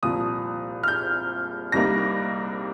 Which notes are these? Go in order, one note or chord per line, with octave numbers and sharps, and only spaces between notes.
C2 A#2 F3 D#6
F6
G6
C2 C3 G3 A#3 D#4 A#6